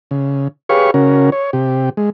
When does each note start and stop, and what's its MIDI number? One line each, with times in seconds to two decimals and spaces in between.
0.11 0.48 49
0.69 0.91 67
0.69 0.91 68
0.69 0.91 71
0.69 0.91 73
0.69 0.91 77
0.69 0.91 85
0.94 1.30 49
0.94 1.30 61
0.94 1.30 66
0.94 1.30 70
1.32 1.51 73
1.53 1.90 48
1.53 1.90 67
1.97 2.10 56